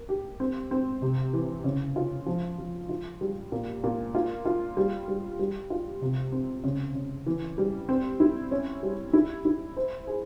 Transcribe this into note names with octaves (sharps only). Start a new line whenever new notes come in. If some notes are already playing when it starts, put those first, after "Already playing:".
Already playing: A#3
G4
C4
C4
C3
E3
C#3
F4
F3
F3
F4
G3
A#2
A#2
F4
F4
G3
G3
G3
F4
C3
C4
C#3
C#3
E3
G3
C4
E4
C#4
G3
E4
E4
C5
G#4